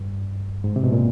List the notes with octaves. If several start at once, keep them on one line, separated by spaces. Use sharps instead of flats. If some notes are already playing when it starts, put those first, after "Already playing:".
Already playing: G2
G#2
C3
B2
A#2